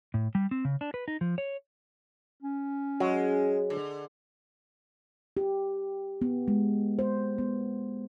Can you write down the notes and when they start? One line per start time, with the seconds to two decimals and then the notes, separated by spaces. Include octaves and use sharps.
0.14 A2
0.35 G3
0.51 C4
0.65 C#3
0.81 D4
0.94 B4
1.08 D#4
1.21 F3
1.38 C#5
2.42 C#4
3.00 F#3 G#3
3.70 D3
5.37 G4
6.21 B3
6.48 G#3
6.99 C5
7.38 B3